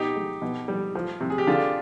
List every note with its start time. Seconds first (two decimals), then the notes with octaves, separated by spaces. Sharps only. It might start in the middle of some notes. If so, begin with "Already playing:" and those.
Already playing: B2 D#4 G4
0.16 G#3
0.42 B2
0.68 G3
0.95 F3
1.21 C3
1.30 G#4
1.38 G4
1.47 D3 D4 F4